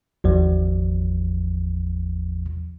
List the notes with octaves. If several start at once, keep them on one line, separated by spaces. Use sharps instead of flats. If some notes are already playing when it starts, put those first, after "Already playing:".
G#1 E2 F3